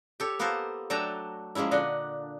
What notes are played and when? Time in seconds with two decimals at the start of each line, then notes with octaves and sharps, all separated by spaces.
0.20 G4 A4 C#5
0.39 A#3 B3 F4 A4 A#4 C5
0.90 F#3 A3 D4 G5 A5 A#5
1.55 F3 G#3 A#3 C#4 E4
1.71 A#2 D3 D4 D#5 F#5